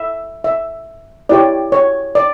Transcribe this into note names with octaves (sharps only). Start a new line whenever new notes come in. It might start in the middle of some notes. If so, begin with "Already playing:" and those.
Already playing: E5
E5
E4 G4 C#5 D5
C#5
D5